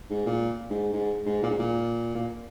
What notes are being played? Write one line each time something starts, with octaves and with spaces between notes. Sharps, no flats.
G#2
A#2
G#2
G#2
G#2
A#2
G#2
A#2
A#2